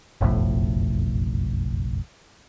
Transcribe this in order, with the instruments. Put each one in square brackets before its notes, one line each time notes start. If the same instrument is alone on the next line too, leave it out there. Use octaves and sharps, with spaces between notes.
[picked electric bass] F#1 B1 F2 A2